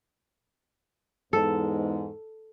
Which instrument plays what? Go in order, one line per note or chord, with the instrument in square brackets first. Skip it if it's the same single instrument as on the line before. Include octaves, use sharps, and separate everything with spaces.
[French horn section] E2 G#2 [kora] A4